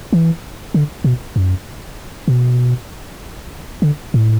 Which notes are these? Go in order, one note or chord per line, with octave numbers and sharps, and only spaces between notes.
E3
D3
B2
F#2
B2
D3
A2